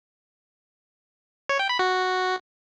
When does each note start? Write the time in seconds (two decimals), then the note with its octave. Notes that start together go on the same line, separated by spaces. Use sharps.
1.49 C#5
1.59 G5
1.69 B5
1.79 F#4